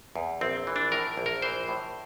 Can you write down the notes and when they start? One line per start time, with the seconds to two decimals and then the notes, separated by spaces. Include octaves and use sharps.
0.16 E2
0.41 A#1 C4
0.67 E3
0.76 D4
0.92 A2 A#4
1.17 A#1
1.26 A#4
1.42 E3 C5
1.68 A2